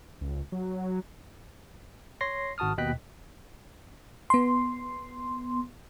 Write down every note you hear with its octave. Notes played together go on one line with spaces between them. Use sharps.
C#2
F#3
C#5 C6 A#6 C7
G#1 F#4 A5 D#6 F6
D#2 B2 D#5 G5 F#6 B6
B3 C6